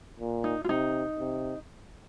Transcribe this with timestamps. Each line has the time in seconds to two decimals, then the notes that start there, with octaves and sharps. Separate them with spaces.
0.20 A#2
0.44 D#4
0.64 F4
0.69 C3 D#4
1.19 C3